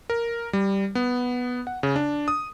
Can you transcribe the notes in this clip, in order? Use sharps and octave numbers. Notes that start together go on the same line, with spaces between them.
A#4
G3
B3
F#5
C#3
D4
D#6